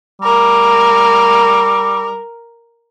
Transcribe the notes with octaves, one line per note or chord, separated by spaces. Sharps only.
G3 A#4